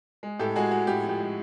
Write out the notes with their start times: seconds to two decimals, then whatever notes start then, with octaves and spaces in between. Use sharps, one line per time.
0.23 G#3
0.39 A2 G4 A4
0.56 G#3 F#4 G#4
0.71 G#3 F#4
0.87 A2 G4
1.03 F3
1.09 G4
1.20 G#3